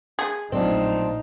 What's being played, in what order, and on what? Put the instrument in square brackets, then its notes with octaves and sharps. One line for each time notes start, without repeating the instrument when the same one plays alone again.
[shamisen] G#4
[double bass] A#1 D#4 [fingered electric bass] A2 F#3 A3 [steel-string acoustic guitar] C4 D4 F4